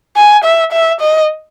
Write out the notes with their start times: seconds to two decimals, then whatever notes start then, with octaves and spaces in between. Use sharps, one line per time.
0.17 G#5
0.44 E5
0.72 E5
1.00 D#5